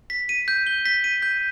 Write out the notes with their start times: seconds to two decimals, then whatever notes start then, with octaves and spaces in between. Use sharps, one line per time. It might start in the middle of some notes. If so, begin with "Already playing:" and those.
0.10 B6
0.29 D#7
0.48 G6
0.67 G7
0.85 B6
1.04 D#7
1.22 G6